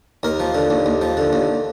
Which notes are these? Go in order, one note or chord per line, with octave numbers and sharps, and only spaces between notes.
D#2 A#4
F3
D3
D#2
D#2
F3
D3
D#2